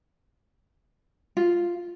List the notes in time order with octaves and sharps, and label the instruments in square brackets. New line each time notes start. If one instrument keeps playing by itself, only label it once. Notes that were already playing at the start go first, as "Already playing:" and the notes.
[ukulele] F4